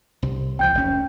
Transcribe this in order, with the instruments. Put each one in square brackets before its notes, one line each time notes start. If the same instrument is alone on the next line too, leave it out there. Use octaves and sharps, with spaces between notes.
[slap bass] C2 C3
[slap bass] C#2 F3 [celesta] G5 G6
[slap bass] F1 C#4